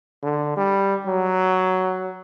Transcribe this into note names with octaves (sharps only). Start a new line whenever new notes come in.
D3
G3
F#3